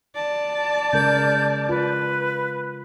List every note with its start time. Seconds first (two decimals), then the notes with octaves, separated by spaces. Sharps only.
0.15 D5 A5
0.93 C#3 G#3 A#4 G6
1.69 F4 B4